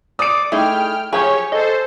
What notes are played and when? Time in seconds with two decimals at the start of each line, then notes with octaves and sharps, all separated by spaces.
0.19 D5 D#6 D7
0.52 A3 D#4 E4 G#4 G5 F6
1.13 F3 G4 G#4 C#5 G#5 C#6
1.52 A4 C5 D#5